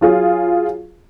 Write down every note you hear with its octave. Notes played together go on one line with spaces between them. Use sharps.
F#3 F4 G#4